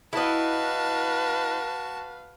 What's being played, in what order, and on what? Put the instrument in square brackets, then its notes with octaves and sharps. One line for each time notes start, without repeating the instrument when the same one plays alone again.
[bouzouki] E4 D#5 [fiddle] F#4 A5 [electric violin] B4 F5